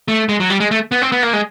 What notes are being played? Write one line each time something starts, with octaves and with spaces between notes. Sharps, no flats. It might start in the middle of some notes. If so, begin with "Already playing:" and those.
A3
G#3
F#3
G3
G#3
A3
B3
C4
B3
A#3
G#3